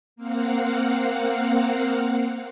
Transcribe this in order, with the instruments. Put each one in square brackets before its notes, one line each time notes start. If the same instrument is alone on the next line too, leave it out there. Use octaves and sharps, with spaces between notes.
[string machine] A#3 C4 F5 F#5